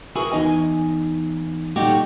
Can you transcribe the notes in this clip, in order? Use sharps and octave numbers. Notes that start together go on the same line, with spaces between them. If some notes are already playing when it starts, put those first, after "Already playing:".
E4 F#4 G#4 A#4 B4
E2 D#4 D#5 G#5
A#2 G3 A3 D#4 F#4 G4